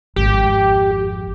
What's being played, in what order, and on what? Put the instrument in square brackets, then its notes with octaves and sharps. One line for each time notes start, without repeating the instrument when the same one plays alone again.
[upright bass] G#1 F2 [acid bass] G4